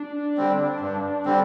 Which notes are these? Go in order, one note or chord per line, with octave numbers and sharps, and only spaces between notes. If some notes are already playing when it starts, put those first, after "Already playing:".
Already playing: D4
D3 G3 C4
G2
D3 G3 C4